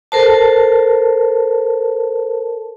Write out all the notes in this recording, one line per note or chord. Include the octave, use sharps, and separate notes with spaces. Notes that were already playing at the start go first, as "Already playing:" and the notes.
A4 A#4 C5 A5